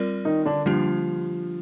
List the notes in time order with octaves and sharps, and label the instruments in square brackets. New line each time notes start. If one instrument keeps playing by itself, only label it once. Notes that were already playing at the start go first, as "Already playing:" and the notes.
Already playing: [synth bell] G3 C4 F4 A#4 D5
[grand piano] D#3 D#4
D3 D4
[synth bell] D3 G3 A#3 D4 G4 [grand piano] F3